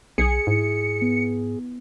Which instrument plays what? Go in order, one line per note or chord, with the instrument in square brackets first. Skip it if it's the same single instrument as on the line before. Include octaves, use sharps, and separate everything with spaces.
[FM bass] B1 [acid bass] G#4 [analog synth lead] C#7
[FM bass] G#2 [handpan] E4
[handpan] B3